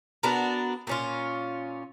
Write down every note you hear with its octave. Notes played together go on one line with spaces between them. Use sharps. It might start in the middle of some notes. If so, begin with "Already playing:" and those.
B3 D4 F#4 A#4
A#2 C#4 F4